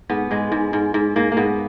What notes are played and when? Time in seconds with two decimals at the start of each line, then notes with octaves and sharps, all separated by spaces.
0.09 G#2 B3
0.31 G#2 G#3
0.52 G#2
0.73 G#2
0.94 G#2
1.16 G#2 A#3
1.32 A#3
1.37 G#2 B3